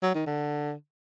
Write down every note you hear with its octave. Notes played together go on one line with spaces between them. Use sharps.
F#3
D#3
D3